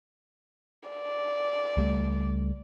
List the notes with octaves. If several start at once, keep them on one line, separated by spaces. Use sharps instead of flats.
D5
C#2 G3 A3